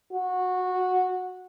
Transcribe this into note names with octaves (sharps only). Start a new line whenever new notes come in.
F#4